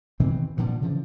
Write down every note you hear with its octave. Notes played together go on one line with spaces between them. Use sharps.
B2 D#3 E3 C4
G2 A#2 D3 F3
C#3 E3 F3